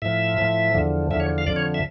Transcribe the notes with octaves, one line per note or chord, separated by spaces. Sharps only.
A2 F3 E5
A2 F3
E2 D3 F3
E2 D3 F3 E5
C#5
F5
F2 D3 F3 D5
C#5
E5